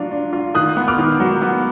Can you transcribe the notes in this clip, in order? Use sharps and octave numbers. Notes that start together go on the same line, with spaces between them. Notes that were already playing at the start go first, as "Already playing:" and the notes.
Already playing: F#3 D4 F4
D4
F4
D#3 D#6 F#6
B3
D6 F6
D#3
F#3
B3